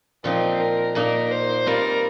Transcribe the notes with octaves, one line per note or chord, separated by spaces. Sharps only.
A#2 F3 C4 D#4
A#4
A#2 A#3 D#4 A#4
C5
G3 C4 F4 A#4